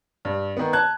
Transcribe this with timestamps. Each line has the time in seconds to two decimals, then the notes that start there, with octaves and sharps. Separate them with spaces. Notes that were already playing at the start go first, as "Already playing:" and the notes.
0.25 G2
0.57 D#3 B3
0.73 A5 F#6 G#6